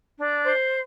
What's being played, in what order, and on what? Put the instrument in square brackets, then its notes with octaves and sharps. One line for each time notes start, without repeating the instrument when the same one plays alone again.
[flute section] D4
C5